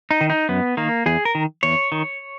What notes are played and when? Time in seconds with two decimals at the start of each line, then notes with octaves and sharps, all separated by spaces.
0.11 D#4
0.21 D#3
0.30 D#4
0.49 F#2 B3
0.77 D#3 A#3
1.06 E2 G#4
1.25 A#4
1.35 D#3
1.63 E2 C#5
1.92 D#3